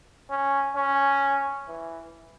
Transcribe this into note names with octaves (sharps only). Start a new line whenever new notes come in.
C#4
C#4
E3